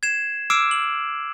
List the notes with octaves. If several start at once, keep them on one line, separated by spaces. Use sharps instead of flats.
G#6 C7 E7
D6 E6 F6 C7 D7 E7
F#7